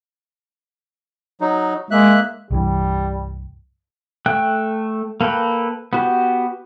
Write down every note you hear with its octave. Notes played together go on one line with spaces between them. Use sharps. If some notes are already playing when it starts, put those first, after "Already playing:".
F#3 D#4
G#3 A#3 E5 F#6
C2 G2 E3 G3
A3 G5 F#6
A#3 A4 B4 G5
B3 F#4 G4